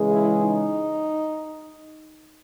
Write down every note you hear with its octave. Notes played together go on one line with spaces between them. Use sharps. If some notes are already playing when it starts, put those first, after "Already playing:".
Already playing: C#3 E3 G#3
E4
D#4